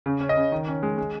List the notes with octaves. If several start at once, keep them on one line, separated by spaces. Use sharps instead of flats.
C#3
C#4
D#5
C#3
D#3
C#4
G#3
G#3